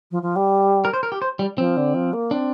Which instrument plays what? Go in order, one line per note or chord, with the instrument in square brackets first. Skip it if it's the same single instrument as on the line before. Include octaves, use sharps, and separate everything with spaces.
[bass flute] F3
F3
G3
[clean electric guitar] A#4
C5
A#4
G4
C5
G3
[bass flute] F3 [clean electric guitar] C4
[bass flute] D3
F3
A#3
[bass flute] C4 [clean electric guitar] D4